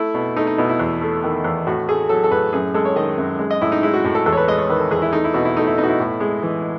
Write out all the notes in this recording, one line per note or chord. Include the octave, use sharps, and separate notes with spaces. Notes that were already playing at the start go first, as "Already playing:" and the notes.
Already playing: A3 E4
B2
A3 D#4
D#4
B2 E4
E4
E2
A3
D#3
E2
A2 F#4
A3 G#4
F#3 A4
A4
A2 B4
F#2 G#4
G#3 A4
C#5
D#3 D#5
F#2
G#3
D#5
A2 E4
D#4
G#3 E4
F#4
A2 F#4
A4
E2 A4
C#5
B4
G#3 D#5
C#5
D#3 B4
A4
E2 G#4
E4
A3 D#4
E4
B2 F#4
E4
A3 D#4
E4
B2 D#4
F#4
E4
A2
G#3
E3